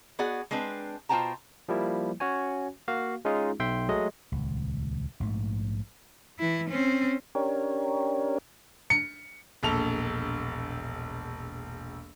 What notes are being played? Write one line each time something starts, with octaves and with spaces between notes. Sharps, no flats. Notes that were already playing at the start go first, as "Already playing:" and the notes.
B3 F#4 G#4 D5 F#5
G#3 C4 D4 B4
B2 F4 C5 G5 A5 A#5
F3 G3 A#3 E4
C#4 F#4 C#5 G#5
A#3 F#4 F5
G#3 C#4 D#4 F4 G#4
B1 E5 G5 C6
F#3 G#3 A3 D#5
D#1 C#2
A#1 G#2 A3
E3 E4
C4 C#4
C#4 D4 G4 A#4 C#5
C#7
E1 A#1 A4 F7